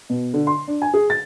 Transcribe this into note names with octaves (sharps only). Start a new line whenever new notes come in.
B2
D3
C6
D4
G#5
G#4
A6